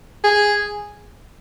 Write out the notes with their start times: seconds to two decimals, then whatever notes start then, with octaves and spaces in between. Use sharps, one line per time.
0.24 G#4